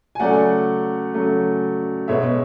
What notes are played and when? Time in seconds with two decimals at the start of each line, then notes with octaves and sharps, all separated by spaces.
0.15 G#5
0.20 C#3 F#3 A3 D5 F#5
1.14 C#3 F#3 A3
2.08 B2 G#3 B3 C#5 E5